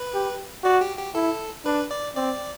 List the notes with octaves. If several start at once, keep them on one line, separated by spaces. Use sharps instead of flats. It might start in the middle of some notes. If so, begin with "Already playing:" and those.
Already playing: B4
G4
F#4 D5
G4
G4
E4 A4
D4 B4
D5
C4 D5